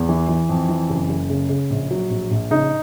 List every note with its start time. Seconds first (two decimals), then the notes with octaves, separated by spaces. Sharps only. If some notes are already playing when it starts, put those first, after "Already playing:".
Already playing: E2
0.09 E3
0.28 E3
0.49 F2
0.69 E3
0.90 F#1
1.09 F#1
1.30 C#3
1.49 C#3
1.70 A#1
1.91 F#3
2.10 A#1
2.31 A#1
2.51 C#3 D#4